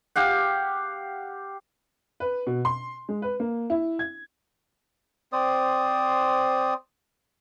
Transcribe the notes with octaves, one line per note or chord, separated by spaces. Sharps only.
G4 F5 F#5
B4
B2
C6
G#3
B4
A#3
E4
G#6
C4 C5 D5 D#6